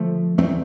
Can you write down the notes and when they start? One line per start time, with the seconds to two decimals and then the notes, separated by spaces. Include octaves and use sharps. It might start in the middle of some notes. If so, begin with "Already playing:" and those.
Already playing: D3 F3 A3
0.38 E2 A3 C4